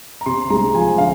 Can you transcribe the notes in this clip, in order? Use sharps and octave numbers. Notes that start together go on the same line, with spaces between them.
A#5
C3 C6
G#3 A#5
F3 G#5
D3 F5